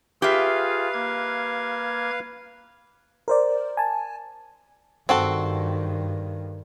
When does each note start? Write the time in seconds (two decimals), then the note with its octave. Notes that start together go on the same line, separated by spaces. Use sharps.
0.22 F4 G4 G#4 B4 E5 F5
0.94 A#3 G#6
3.28 A#4 C5 D5
3.77 G#5 A5
5.09 G2 D#3 C4 F#4 A4